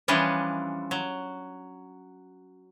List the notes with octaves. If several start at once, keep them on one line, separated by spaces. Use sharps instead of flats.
E3 F3 G3 C#4 D4
F#3